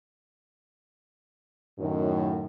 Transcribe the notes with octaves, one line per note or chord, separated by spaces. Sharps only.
F#2 A2 D#3